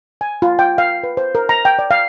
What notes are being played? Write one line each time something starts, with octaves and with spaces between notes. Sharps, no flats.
G#5
F4
G5
F5
B4
C5
A#4
A#5
G5
D5
F5